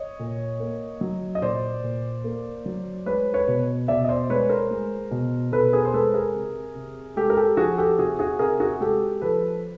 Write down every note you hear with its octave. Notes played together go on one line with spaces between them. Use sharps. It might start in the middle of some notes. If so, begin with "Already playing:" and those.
Already playing: C#5 D#5
A#2
A#3
F#3
D#5
A#2 C5 D5
A#2
A#3
F#3
G#3 B4 C#5
B4 C#5
B2
B2 D5 E5
D#5
C5 D5
G#3 B4 C#5
A#4 C5
G#3
B2
B2 A4 B4
G#4 A#4
C5
G#3 A4 B4
G#4 A#4
C3
C3
G#3 G4 A4
A#4
G4 A4
F3 F#4 G#4
G4 A4
C3 F#4 G#4
F#4 G#4
C3 G#4 A#4
F#4 G#4
G#3 G4 A4
F3 A4 B4